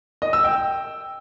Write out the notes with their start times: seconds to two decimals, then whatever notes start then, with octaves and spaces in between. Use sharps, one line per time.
0.22 D#5
0.33 E6
0.44 G5